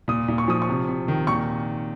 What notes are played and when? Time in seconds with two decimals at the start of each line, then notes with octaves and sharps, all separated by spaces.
0.08 A#2 D#6
0.28 A#2
0.38 C#6
0.48 F3 D#6
0.62 C#6
0.69 C3
0.87 C3
1.08 D#3
1.27 A#2 C#6